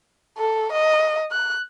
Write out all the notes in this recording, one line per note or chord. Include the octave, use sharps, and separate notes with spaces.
A4
D#5
F#6